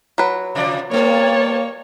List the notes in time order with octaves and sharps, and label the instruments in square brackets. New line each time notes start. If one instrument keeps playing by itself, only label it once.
[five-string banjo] F#3 B4
[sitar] C3 F3 D5
[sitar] G2 B3 [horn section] A#3 [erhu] C#5